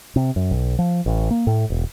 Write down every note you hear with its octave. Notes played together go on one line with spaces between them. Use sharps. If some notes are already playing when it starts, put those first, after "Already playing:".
C3
F#2
B1
F3
A1
A#3
A2
E1